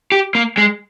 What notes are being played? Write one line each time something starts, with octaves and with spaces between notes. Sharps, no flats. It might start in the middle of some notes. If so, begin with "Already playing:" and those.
G4
A#3
G#3